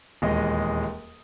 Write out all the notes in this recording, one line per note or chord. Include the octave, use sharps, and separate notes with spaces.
D#1 E2 G#3 D#5 D#6